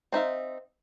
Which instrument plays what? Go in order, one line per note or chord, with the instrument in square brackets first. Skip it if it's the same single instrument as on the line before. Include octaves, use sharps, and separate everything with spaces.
[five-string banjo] C4 D#4 E5 F5